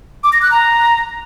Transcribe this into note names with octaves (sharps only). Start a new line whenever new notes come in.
D6
A#6
F#6
A#5